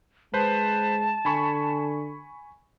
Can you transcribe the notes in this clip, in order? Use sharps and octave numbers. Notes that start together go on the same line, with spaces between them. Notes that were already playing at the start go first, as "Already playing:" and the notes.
G#3 B4 C5 A5
D3 G#5 B5 C#6